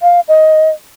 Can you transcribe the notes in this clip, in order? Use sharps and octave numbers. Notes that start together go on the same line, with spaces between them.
F5
D#5